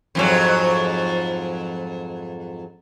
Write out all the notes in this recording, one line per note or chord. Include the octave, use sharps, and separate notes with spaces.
F2 G#2 F#3